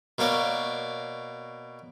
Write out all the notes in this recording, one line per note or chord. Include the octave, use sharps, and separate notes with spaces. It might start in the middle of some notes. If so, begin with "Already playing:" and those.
B2 A#3 C#5 D5